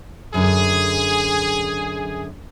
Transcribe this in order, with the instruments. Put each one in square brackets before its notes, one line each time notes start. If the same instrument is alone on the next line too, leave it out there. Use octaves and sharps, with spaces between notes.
[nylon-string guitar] F#2 D3 [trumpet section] G#4